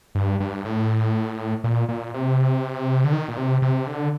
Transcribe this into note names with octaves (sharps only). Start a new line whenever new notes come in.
G2
G2
A2
A#2
A#2
C3
D3
D#3
A#2
C3
C3
D3